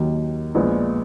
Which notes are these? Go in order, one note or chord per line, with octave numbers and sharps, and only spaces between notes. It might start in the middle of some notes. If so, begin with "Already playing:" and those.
Already playing: D#2 D#3 F#3
A#1 A#2 F3 G#3 B3